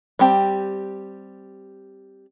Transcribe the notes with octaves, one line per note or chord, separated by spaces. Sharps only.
G3 C4 G4 A5